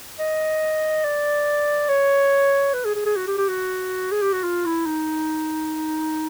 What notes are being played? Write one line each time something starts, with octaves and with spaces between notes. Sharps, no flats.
D#5
D5
C#5
B4
G#4
G#4
G#4
F#4
G4
G4
F#4
G#4
G4
F#4
F4
E4
D#4